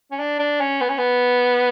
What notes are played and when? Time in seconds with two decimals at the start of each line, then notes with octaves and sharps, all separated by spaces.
0.11 C#4
0.19 D4
0.39 D4
0.60 C#4
0.81 B3
0.89 C#4
0.98 B3